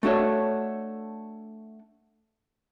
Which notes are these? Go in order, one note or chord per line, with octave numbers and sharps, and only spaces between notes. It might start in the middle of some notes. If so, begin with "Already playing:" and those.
A3 D4 F#4 A4 C#5